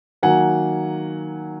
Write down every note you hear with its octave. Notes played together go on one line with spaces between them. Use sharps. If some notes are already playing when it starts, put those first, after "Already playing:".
D#3 F#3 A#3 F#5 G#5